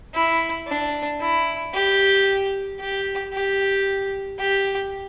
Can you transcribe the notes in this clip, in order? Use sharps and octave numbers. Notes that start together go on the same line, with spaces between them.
E4
D4
E4
G4
G4
G4
G4